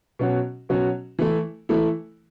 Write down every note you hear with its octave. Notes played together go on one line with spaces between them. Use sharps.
B2 F#3 C#4 F#4
B2 F#3 C#4 F#4
E3 A3 E4
E3 A3 E4